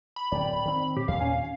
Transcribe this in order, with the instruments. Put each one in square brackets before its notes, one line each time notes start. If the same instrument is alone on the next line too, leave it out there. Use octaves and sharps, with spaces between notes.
[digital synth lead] B5
[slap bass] D1 F#2 [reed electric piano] D5 G5
[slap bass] D#3 C4
[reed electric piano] A2 [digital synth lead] G4
[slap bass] D#2 A#2 [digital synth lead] F5
[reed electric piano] C#4 G#5